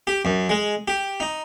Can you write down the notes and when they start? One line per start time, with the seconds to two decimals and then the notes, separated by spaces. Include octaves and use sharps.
0.07 G4
0.25 F#2
0.49 G#3
0.88 G4
1.20 D#4